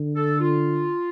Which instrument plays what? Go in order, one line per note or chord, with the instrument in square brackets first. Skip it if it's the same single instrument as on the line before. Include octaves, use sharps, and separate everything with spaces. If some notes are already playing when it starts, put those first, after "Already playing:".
Already playing: [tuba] D3
[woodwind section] A4
F4